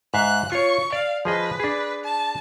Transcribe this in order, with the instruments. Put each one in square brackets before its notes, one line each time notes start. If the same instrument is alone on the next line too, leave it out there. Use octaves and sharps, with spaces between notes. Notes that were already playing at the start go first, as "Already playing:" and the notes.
[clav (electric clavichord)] G#2 E5 F5 [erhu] F#6
[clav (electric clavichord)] F4 C#5 [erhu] C#6
[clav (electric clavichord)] D5 [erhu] F5
[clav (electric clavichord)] F3 G#4 D#5 [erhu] B4
[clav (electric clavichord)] D4 G#4
[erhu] A5